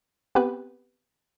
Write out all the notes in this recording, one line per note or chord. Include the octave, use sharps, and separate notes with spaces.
B3 C4 G4 B4